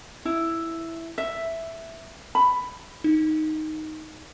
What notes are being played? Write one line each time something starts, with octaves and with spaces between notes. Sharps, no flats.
E4
E5
B5
D#4